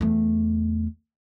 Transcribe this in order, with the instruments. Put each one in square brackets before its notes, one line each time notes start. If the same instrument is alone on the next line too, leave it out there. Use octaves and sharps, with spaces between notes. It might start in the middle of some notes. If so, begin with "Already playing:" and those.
[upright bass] E2 A3